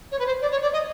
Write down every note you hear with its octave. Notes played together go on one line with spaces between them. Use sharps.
C#5
B4
C5
D5
C#5
D5
D#5